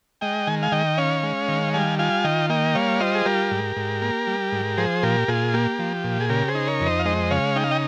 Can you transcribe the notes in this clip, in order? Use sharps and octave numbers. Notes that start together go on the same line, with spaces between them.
G#3 D#5 G5
D#3 G#5
F5 G#5
D#3 D#5 G5
C#4 C#5 F5
G#3
D#3
G3 F5 G#5
F4 F5 G#5
D#3 D#5 G5
A#3 D#5 G5
G3 C#5 F5
F4 C5 D#5
G#4
G3 G4 A#4
G#2
G#2
A#3
G3
G#2
F3 G#4 C5
A#2 G4 A#4
A#2 F4 G#4
A#3 G4
F3
A#2
G#4
C#3 G4 A#4
G#4 C5
D#4
A#4 C#5
F2
C5 D#5
F5
G#3 C5 D#5
C#3 C#5 F5
D#4 G5
F5
D#5 G5